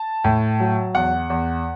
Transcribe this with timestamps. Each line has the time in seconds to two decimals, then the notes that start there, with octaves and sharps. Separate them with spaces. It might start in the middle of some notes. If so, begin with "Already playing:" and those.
Already playing: A5
0.24 A2
0.60 F#3
0.95 E2 F#5
1.30 E2